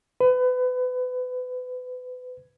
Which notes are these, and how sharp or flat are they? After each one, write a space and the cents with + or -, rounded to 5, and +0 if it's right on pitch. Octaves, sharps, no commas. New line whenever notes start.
B4 +30